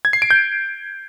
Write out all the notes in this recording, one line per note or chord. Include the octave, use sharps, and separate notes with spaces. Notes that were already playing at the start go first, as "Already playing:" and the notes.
G#6
C7
D7
G6